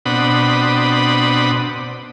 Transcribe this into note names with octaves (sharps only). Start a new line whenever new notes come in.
B2 C4 D4 F#5 B5 D#6